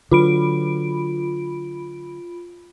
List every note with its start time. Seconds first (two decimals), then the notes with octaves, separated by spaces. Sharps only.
0.12 D3 F#3 F4 B5 D7